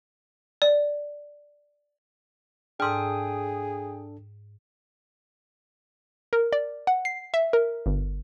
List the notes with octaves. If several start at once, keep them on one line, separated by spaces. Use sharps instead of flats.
D5
G#2 D4 G#4 A4 G5 D#6 F6
A#4
D5
F#5
C7
E5
A#4
G1